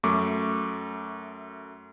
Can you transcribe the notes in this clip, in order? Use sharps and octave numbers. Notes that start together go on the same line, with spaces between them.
F#2 A3 C#6 D6